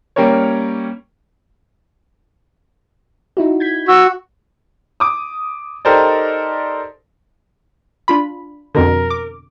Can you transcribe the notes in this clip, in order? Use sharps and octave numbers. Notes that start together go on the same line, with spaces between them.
G3 A#3 C#4 A#4 C#5
D#4 E4 F#4
G6 G#6 B6
F#4 E6
D6 D#6
D#4 G4 A4 A#4 C5 D5
D4 F4 B5
F2 B2 D3 A#4
D6